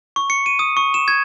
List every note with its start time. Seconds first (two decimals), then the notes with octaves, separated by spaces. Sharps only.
0.16 C#6
0.30 C#7
0.46 D#7
0.59 D#6
0.77 C#6
0.94 E7
1.08 G#6